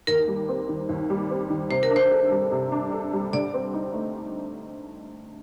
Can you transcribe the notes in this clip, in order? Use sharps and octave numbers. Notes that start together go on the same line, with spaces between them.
D#2 A#4
G3
C4
D#3
D#2
G3
C4
D#3
C3 C5
A#4
D4
C5
A4
G3
C3
D4
A4
G3
D3 D5
C4
D#4
A3